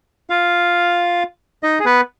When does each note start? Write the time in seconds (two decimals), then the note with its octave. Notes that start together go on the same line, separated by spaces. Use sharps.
0.30 F4 F5
1.63 D#4 D#5
1.80 G#4
1.85 B3 B4